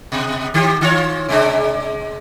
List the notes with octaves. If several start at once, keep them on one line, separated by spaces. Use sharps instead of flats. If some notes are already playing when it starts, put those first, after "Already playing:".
B2
D#3 G4
D#3 F4 C#5
C3 G#3 D4